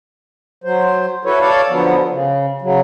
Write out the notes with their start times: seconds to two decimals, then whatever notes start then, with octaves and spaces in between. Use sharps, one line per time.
0.64 F#3 C5
1.25 E4 F#4 A4 B4 C#5
1.40 A4 C#5 D5 F5 A5
1.69 D3 F3 F#3 B3
2.10 C#3
2.62 C#3 F#3